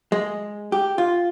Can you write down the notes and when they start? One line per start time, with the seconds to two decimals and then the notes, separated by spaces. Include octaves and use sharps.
0.12 G#3
0.72 G4
0.98 F4